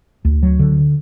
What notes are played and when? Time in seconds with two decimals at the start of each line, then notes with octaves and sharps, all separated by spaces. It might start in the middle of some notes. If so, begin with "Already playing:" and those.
0.25 D2
0.43 F#3
0.59 D3